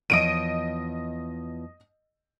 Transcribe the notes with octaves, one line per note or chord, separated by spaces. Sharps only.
E2 F3 C#5 D#5 D7 D#7